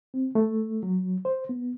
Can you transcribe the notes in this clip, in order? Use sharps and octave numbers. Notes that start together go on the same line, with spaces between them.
C4
A3
F#3
C5
B3